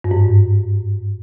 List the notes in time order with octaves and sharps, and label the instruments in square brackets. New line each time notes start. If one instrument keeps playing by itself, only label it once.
[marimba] G2
G#2